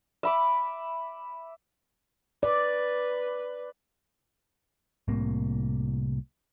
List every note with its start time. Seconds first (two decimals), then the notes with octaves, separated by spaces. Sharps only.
0.23 E5 B5 D6
2.43 B4 D5
5.08 C2 A2 C3 A#3